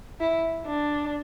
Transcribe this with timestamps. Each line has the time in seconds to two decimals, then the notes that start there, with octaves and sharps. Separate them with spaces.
0.20 E4
0.66 D4